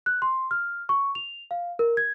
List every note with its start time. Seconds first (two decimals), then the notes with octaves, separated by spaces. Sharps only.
0.06 F#6
0.22 C6
0.51 F6
0.89 C#6
1.15 F7
1.51 F5
1.79 A#4
1.97 G#6